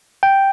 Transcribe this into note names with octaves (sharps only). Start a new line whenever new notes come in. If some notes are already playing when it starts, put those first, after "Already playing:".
G5